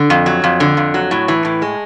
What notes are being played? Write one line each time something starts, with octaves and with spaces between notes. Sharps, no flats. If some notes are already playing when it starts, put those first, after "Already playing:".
Already playing: D3
F2
F#3
F2
D3
F2
F#3
A2
E3
A2
G#3